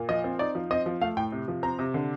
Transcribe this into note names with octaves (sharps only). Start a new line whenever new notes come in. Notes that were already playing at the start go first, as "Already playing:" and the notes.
Already playing: A#2
F3 D#5
C4
D#4 D5
F3
C4 D#5
F3
A3 F5
A2 G5
C3
F3
C4 A#5
C3
D3